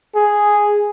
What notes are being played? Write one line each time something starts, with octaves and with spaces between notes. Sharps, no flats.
G#4